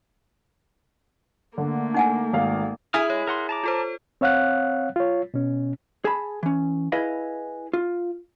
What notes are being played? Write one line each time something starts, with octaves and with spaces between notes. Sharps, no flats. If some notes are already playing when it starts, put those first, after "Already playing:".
D3 A3 A#3
D#4 F#5 G#5
G#1 F5
E4 G#4 G#5 D#6 F6
G#3 C#5
A#4 F#5 C6
A5 A#5 D6
F4 A4 C5
C4 C#5 F5 F#5 F#6
F4 C#5
B2 C#4
G#4 A5 B5
E3 C#4
E4 G#4 B4 D#5 F5
F4